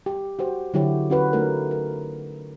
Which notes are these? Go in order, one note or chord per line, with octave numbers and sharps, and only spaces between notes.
G4
F#4 G4 C5
D3 F#3 E4 F#4 G4 C#5
C#4 F#4 B4
A3 D#4 A#4
A#4